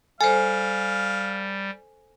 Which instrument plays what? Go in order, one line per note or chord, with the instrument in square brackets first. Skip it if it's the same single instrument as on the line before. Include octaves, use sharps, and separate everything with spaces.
[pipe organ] G3 [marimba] A4 C5 [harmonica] F5 [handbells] G#5